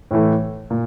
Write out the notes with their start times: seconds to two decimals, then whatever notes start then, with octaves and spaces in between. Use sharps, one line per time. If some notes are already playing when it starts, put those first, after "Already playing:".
0.11 A2 E3 A3
0.70 A#2